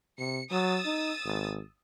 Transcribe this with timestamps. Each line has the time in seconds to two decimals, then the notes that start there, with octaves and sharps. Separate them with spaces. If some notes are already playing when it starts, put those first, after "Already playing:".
0.19 C3 C#7
0.51 F#3 D#6 E6 A6
0.86 D#4
1.24 G#1